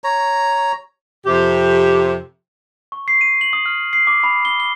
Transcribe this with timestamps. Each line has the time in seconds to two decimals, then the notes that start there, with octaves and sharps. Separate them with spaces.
0.04 C#5 A#5
1.25 F2 C3 G4
2.92 C#6
3.08 C7
3.21 D#7
3.41 F#7
3.53 D#6
3.66 F6
3.93 C7
4.07 D6
4.24 B5
4.45 G7
4.60 G7